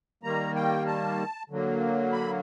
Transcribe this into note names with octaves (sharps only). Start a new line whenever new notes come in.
D#3 G3 A#3 A#5
G5
A5
D3 F#3 A#3
B5